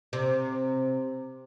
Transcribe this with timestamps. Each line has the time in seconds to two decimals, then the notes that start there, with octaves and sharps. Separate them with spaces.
0.13 C3